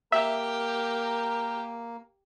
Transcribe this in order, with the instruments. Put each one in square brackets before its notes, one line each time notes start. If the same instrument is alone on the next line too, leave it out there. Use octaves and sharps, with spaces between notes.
[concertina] A#3 [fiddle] G4 [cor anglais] A#4 [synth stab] E5